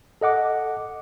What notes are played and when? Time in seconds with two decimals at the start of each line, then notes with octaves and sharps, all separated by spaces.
0.21 A4 D#5 F#5 D6